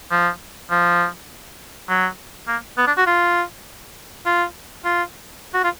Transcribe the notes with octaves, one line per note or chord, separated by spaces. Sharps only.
F3
F3
F#3
A#3
B3
D4
F#4
F4
F4
F4
F#4
F4